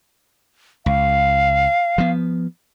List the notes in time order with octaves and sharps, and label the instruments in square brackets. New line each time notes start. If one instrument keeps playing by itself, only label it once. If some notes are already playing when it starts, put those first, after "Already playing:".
[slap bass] C#2 [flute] F5
[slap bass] F3 B3